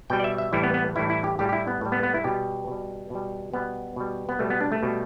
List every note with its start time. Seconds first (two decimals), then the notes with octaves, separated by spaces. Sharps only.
0.10 B2 G3 G5
0.20 D5
0.24 E5
0.38 E5
0.53 A2 E3 G3 E4
0.63 B3
0.74 B3
0.96 A2 E3 G3 E4
1.10 E4
1.24 G4
1.39 A2 G3 G4
1.49 G4
1.53 E4
1.67 B3
1.81 A2 G3
1.92 B3
2.03 B3
2.14 E4
2.24 B2 G3 G4
2.67 B2 G3
3.10 B2 G3
3.53 B2 G3 B3
3.96 B2 G3
4.29 B3
4.39 B2 G3 A3
4.50 B3
4.61 D4
4.72 A3
4.83 B2 G3